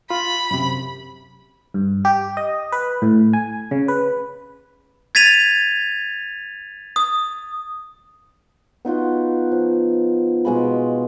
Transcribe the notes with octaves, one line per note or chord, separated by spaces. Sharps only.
F4 B5
F#2 C3
G2
G4
D#5
B4
A2
G#5
C#3
B4
G#6 A6 B6 D#7 F7
D#6
B3 D#4 F4 F#4
F3
B2 G#3 F4 B5